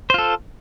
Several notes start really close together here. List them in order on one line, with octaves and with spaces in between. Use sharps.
C5 F4 A4